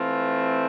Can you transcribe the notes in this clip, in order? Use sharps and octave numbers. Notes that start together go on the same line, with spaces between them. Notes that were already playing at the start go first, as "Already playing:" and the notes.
Already playing: E3 A3 C4 F4